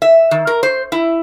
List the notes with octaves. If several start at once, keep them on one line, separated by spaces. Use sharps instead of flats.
E5
D#3
A#4
C5
E4